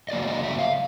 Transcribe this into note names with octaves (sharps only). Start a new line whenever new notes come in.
D#5
C#3 F#3 A#3 D5
D5
D#5
E5
F5